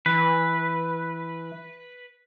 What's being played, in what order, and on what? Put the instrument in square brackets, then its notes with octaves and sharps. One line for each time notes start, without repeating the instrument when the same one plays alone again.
[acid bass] E3 [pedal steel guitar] B4